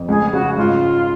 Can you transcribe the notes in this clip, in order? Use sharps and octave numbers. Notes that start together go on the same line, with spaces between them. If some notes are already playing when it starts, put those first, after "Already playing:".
Already playing: F2
C#2 G#4
C#3 F#4
G#2 F4